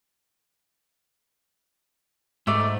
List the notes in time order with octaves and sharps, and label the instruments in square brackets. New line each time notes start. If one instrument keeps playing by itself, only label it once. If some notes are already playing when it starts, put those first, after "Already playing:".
[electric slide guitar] G#2 [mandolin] A3 D5